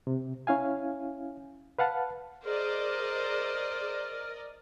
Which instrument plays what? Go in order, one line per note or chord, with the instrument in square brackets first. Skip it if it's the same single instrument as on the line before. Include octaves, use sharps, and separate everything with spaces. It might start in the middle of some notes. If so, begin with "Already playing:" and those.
[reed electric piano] C3
C#4 E4 F5 G#5
B4 F5 F#5 A5
[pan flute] G#4 [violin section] A#4 D5 D#5 [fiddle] C5 [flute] F6